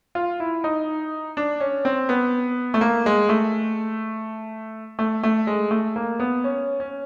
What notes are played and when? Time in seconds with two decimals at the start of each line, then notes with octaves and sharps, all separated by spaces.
0.15 F4
0.40 E4
0.64 D#4
1.37 D4
1.60 C#4
1.85 C4
2.09 B3
2.74 A3
2.81 A#3
3.06 G#3
3.29 A3
4.99 A3
5.23 A3
5.47 G#3
5.71 A3
5.96 A#3
6.20 B3
6.44 C#4
6.80 C#4